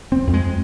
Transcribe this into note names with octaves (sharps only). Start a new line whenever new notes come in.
F1 C4
F2
G#3